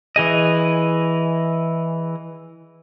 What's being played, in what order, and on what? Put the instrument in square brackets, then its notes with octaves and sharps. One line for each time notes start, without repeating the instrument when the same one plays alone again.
[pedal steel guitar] E3 G#4 D#5